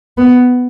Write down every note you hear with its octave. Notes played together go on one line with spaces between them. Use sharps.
B3